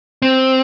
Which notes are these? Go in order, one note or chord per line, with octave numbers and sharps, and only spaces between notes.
C4